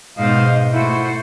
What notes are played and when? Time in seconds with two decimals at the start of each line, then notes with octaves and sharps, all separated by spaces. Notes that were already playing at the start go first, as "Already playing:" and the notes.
0.18 G#2 B2 C5 D#5 F5
0.71 A3 E4 F#4 C5